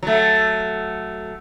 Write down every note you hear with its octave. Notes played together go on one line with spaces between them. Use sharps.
F#3 A3